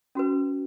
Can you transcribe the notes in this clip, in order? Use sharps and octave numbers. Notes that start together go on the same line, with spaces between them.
C#4 F#4 B4